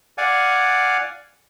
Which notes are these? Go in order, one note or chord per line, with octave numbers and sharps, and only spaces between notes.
D5 F5 F#5 G#5